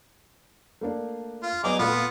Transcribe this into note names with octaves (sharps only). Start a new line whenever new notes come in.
A3 A#3 D4
F4
F#3 B3 D#4 G#4 D5 D6
A#2 A3 B3 F4